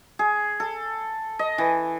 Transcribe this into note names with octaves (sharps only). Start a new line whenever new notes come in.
G#4
A4
D#5
E3